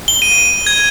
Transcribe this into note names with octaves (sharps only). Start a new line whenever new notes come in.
G7
D#7
G#6